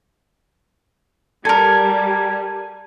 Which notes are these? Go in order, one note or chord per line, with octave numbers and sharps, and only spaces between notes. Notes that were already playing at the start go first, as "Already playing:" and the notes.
G3 A4 A#4 G#5